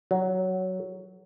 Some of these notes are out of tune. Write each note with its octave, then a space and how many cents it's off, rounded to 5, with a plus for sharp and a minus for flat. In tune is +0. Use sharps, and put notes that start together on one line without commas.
F#3 +10